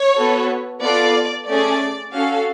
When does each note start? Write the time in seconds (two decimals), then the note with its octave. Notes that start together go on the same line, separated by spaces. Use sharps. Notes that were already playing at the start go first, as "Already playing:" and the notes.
Already playing: C#5
0.16 B3 F#4 A4
0.82 B3 F4 A4 D5
1.47 A3 C#4 G#4 D5
2.13 C#4 F#4 A4 F5